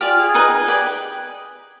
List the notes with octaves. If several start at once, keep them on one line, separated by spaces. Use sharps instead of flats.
F4 G4 D5 F5 G#5
G#4
D#4 B4 D#5 G#5
G4 B4 D5 G5